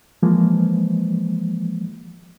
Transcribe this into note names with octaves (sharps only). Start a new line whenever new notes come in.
E3 F3 G#3 A#3